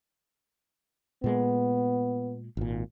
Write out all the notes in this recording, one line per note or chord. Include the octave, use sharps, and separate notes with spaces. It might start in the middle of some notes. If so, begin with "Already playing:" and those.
A#2 G#3 B3
G#1 A#2